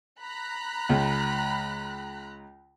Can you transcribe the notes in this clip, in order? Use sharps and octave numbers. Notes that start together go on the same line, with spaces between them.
A#5 B5 F#6
C#2